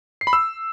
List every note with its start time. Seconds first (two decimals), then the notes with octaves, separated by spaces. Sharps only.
0.21 C7
0.27 B5
0.33 E6